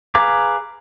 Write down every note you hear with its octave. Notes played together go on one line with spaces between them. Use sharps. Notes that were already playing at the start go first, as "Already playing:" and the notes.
G#4 B4 F5 A#5 D6